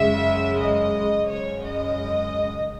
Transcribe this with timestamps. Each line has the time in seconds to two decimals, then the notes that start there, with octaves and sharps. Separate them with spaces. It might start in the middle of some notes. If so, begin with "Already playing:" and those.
Already playing: F#2 C#3 G#3 E5
0.59 D#5
1.30 F#2 C#3 G#3 C#5
1.66 D#5